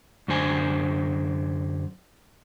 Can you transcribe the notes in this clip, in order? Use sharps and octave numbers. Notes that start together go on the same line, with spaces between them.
F#2 D3 C5 G#5